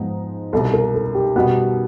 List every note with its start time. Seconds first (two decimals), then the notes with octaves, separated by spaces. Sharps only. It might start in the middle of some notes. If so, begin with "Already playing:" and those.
Already playing: G#2 F3 G#3 B3 D#4
0.53 C2 B2 G3 A4
0.73 A#4
0.94 A4
1.15 G4
1.36 B2 G3 B3 F#4